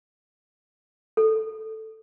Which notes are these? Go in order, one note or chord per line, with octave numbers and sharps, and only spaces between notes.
A4